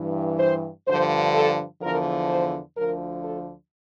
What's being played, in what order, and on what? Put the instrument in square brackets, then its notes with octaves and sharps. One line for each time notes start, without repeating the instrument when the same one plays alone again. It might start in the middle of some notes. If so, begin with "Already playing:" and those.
Already playing: [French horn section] G2 E3
C5
G2 D3 F3 C5
A4
E2 D3 F3 A#4
C5
D2 D3 F3 A#4
A4